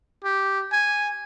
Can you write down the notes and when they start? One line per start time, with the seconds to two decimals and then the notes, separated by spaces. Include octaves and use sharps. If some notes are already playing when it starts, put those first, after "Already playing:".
0.24 G4
0.73 G#5